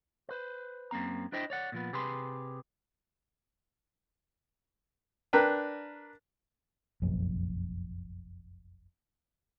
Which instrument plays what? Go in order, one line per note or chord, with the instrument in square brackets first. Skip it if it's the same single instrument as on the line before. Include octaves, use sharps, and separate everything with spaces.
[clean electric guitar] B4 C5
F#2 A#3 C4 A#5
D4 E4 C5 D#5 G5
C#5 D5 F#5
A#2 F3 B3
C3 G4 G#4 B4 C6
[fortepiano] D4 A#4 B4 D5 G5
[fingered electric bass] F1 A#1 F#2